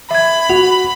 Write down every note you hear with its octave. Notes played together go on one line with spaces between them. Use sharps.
E5 B5 G#6
F#4 F#5 F7